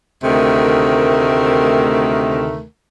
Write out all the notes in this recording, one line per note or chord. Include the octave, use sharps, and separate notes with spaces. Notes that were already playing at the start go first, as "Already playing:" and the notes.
D2 C3 D#3 A3 A#4